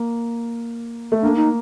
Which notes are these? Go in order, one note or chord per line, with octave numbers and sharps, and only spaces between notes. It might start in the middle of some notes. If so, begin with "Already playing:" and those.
Already playing: A#3
A3
A#3 D4
D#4